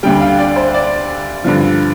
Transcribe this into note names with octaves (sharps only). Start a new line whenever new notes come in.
D2 D3 G3 G5
F5
D5
C5
D5
G2 D3 F3